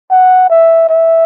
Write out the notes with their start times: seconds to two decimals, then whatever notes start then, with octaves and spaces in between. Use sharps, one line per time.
0.11 F#5
0.50 E5
0.90 E5